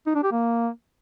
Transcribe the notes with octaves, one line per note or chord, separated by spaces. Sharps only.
D#4
D4
G4
A#3